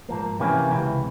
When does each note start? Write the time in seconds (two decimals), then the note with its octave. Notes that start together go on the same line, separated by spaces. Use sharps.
0.09 G#2 F3 A#3
0.40 C3 E3 A#3 C#4
0.71 C#2 C3 E3